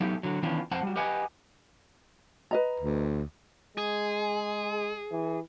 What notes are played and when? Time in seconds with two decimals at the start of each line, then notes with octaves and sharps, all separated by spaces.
0.01 F#3 A3 B3 D#4 G4
0.23 D3 F#3
0.43 D#3 E3 B3 C#4 D4 F4
0.71 F2 C4 F#5 A5
0.83 G3 F#4
0.96 G4 B4 D#5 F#5 G#5
2.51 B4 D#5 A#5
2.80 D2
3.78 G#3 G#4
5.11 E3